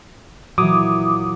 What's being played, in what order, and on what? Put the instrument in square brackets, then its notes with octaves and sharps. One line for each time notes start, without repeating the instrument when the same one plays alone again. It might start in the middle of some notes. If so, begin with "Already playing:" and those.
[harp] A#2 E3 [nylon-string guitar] F#3 [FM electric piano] D6 D#6